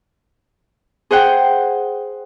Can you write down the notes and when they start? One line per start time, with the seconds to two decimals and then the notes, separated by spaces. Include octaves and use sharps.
1.11 G#4 C5 F#5 G5